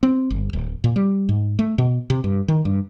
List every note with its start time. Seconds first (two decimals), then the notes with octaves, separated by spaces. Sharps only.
0.03 C4
0.30 G1
0.53 D1
0.84 A#2
0.96 G3
1.29 G#2
1.59 A3
1.78 B2
2.10 C3
2.24 G2
2.48 D#3
2.65 G2